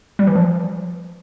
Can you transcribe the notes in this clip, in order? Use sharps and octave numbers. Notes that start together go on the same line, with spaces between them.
G3
E3
F3